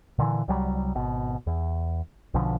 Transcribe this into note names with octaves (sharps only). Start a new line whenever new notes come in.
A#2 D3 E3
C2 F#3 G3
G#1 B2
E2
B1 B2 D3 F3